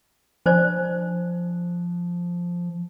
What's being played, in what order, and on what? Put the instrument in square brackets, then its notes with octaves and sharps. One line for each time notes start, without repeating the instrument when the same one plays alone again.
[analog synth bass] F3 [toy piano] D4 C5 D5